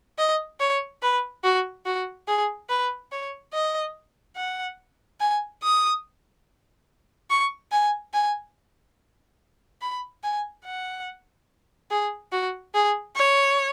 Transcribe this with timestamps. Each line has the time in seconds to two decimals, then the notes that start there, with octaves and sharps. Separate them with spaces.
0.19 D#5
0.60 C#5
1.02 B4
1.44 F#4
1.86 F#4
2.28 G#4
2.69 B4
3.12 C#5
3.54 D#5
4.37 F#5
5.21 G#5
5.63 D#6
7.30 C#6
7.72 G#5
8.14 G#5
9.82 B5
10.23 G#5
10.65 F#5
11.91 G#4
12.32 F#4
12.75 G#4
13.16 C#5